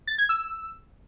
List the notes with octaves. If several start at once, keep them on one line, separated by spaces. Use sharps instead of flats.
A6
G#6
E6